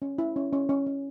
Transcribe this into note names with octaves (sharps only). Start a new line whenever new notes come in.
C#4
E4
C#4
C#4
C#4
C#4